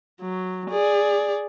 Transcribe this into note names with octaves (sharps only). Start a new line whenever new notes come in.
F#3
G#4 D5